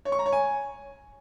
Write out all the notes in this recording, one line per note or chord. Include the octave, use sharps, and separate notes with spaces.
C#5
C#6
A#5
C#5
G#5